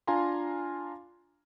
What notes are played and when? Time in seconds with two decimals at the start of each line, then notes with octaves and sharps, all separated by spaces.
0.07 D4 F4 F5 G#5 A#5 C6